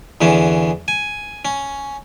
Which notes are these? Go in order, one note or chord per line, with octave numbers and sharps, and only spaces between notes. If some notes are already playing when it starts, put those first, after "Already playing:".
E2 D3 E3 C#4
G#5
C#4